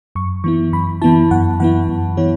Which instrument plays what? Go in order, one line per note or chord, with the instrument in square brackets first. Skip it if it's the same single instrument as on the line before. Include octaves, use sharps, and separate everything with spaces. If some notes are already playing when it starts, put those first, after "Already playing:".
[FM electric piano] F#2 C#6
E3 B3 E4 C#6
F#2 B5
E3 B3 E4 A5
F#2 F#5
E3 B3 E4 F#5
F#2
E3 B3 E4 C#5